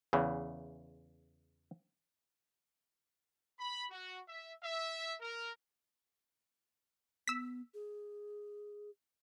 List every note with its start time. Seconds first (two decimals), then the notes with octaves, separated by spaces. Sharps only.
0.13 E2 C#3 E3
3.59 B5
3.91 F#4
4.28 E5
4.64 E5
5.21 A#4
7.28 B3 E6 B6
7.74 G#4